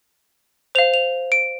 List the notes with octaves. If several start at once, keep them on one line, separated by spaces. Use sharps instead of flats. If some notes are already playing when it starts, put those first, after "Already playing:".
C5 F5 F7
F7
D7